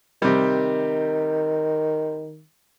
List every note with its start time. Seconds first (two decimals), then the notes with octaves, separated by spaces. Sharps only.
0.22 C3 D#3 G3